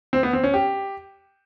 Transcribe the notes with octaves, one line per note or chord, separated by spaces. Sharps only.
C4
B3
C4
C#4
G4